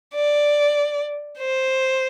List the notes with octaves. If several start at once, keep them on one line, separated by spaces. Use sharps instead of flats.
D5
C5